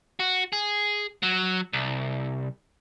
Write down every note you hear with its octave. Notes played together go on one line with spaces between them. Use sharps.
F#4
G#4
F#3
C2